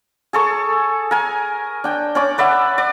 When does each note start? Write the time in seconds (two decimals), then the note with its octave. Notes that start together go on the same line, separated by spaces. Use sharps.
0.33 G#4 A4 C#6
1.11 A#4 G#5
1.84 D4 G5
2.15 C#4 D5 D6
2.38 B4 D5 E5 F#5
2.78 D5